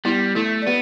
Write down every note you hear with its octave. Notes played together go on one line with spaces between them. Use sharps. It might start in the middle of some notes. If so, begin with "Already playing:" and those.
G3 B3 E4
A3 E4 A4
D5
B3 G4 B4